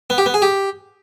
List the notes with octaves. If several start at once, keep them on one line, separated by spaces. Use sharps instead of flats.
B3
G4
B3
G#4
G4